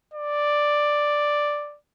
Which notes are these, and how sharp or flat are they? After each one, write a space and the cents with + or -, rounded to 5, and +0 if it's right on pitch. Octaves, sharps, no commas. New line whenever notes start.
D5 +5